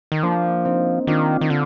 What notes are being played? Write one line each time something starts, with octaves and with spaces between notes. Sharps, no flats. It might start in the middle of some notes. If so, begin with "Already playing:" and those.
D#3
F3 A#3 D4
C4 D#4
D#3 D4 F4
D#3
D3 D4 F4